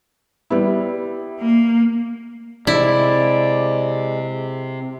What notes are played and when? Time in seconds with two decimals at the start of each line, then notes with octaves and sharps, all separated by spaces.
0.50 G3 B3 E4
1.40 A#3
2.67 C3 G#3 E4 D5